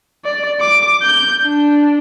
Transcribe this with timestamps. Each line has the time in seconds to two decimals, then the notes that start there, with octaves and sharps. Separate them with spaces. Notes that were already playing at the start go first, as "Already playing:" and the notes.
0.25 D5
0.60 D6
1.03 G6
1.44 D4